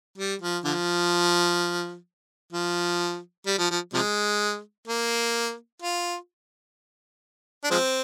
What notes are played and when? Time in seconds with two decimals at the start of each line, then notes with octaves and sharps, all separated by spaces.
0.18 G3
0.42 F3
0.64 D3 F3
2.53 F3
3.46 G3
3.59 F3
3.71 F3
3.94 C3 F3 G#3
4.88 A#3
5.82 F4
7.64 D4
7.71 F3 G#3 C4